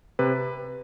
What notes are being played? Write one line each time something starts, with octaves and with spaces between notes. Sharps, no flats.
C3 B4